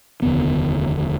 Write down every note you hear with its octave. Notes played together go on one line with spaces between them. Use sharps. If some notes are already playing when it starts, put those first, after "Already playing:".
F1 D#2 D3 B3